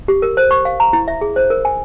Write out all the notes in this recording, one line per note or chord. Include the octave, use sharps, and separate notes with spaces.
G4
A#4
C5
C#6
F5
A#5
E4
E5
G#4
C5
A#4
G#5